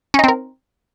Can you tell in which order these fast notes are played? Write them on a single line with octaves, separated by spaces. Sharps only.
C#4 D#4 C4 A#4